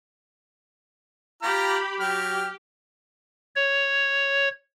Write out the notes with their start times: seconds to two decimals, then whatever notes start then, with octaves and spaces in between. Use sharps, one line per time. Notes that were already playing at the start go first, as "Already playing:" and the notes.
1.42 F4 G4 A#5 B5 F6
2.00 F#3 G4 G5 F6
3.56 C#5